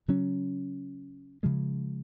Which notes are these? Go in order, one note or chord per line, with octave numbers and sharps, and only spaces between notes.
C#3 F#3 C#4
C#3 F3 G#3